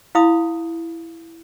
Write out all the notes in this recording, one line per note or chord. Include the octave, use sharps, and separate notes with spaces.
E4 F5 B5 D#6